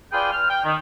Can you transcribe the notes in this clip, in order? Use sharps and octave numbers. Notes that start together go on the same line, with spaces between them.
F4 G#4 B4 D5 G5
F6
G5
D#3